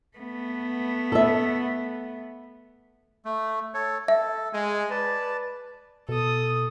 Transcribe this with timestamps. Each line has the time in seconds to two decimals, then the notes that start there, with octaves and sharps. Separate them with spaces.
0.17 A3 B3
1.12 A4 E5
3.25 A3
3.74 A4 C#5
4.08 A4 E5
4.53 G#3 G#5
4.91 B4 D5 A5
6.09 B2 A4 D#6